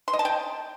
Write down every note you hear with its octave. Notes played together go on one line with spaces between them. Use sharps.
C6
D#5
A5
G5